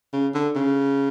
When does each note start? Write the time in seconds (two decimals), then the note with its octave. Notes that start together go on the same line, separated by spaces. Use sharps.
0.13 C#3
0.34 D3
0.55 C#3